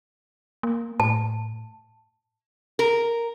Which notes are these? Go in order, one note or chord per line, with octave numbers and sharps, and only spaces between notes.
A#3
A2 A5
A#4